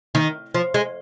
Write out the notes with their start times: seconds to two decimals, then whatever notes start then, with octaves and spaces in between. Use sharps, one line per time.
0.15 D#3
0.54 F3
0.74 G#3